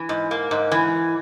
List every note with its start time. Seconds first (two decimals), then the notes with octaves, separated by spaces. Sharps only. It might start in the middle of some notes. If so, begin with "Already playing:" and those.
Already playing: E3
0.09 G#2
0.31 A#3
0.51 G#2
0.72 E3